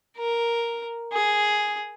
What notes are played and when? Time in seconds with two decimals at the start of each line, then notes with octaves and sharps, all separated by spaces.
0.18 A#4
1.12 G#4